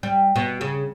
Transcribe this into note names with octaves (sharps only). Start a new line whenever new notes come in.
G3
B2
C#3